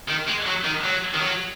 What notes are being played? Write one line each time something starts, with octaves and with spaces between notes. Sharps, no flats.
D#3
G#3
F#3
D#3
F#3
D#3
F#3